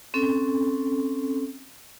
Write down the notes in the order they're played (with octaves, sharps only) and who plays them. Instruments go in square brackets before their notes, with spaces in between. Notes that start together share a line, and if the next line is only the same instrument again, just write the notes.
[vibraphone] C4 C#4 A4